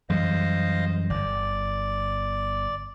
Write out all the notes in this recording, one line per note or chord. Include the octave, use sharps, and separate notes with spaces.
F#2 E3 G3 C5 D#5 F5
G1 D5